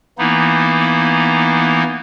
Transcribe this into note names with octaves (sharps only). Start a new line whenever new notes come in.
E3 A#3 B3 D#4 E4